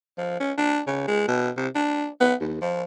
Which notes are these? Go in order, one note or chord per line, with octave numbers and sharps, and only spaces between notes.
F3
C#4
D4
C#3
G#3
B2
C3
D4
B3
D#2
F3